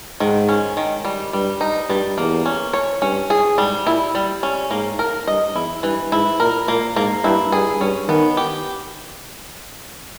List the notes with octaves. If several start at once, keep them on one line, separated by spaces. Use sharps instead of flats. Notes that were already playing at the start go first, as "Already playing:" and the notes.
G#2 D#3
C#4
D#3
G3
G2 G3
D#4
G2 G3
E2 A#3
C#4
C#5
G2 C#4
G#4
G#2 G3
A#2 E4
G3
C#4
G#2 A#3
A#4
G2 D#5
E2 E4
G2 E3
G#2 E4
A#2 A#4
A#2 A#3
G#2 A#3
G2 E4
G2 G#4
G2 C#4
D#3 B3
G4